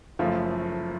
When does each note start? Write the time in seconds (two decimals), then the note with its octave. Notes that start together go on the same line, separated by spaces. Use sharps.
0.19 F#1 F#2 F3 A3 F4